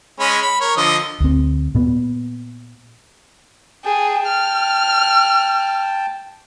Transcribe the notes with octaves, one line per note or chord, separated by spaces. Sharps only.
G#3 C#4 B5
B5
A#4 C#5
D3 F3 D#5
D2 C4
A#2 B3
G#4 G5 A5
F6